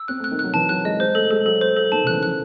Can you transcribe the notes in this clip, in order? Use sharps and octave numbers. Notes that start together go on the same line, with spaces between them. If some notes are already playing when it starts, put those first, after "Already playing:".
Already playing: E6
C4 F#6
A3
F#6
D#3
F#3 F#6
E3 A5
F#3 F#6
G#3 D#5
G#3 C5
A3 A4
G#3 A4
F#3 A4
C5
A4
D#3 A5
C#3 E3 F#6
D#3
E3 F#6